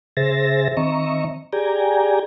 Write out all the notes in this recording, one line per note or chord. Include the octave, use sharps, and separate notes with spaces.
C#3 G#4 C5 E5 A6 A#6
D#3 C4 D#5 E5 A#5 C#6
G4 G#4 D5 G5 G#5 A#5